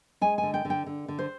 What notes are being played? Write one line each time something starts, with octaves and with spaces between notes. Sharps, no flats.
G#3 G#5
G#5
D3
G5
D3
G5
D3
D3
C5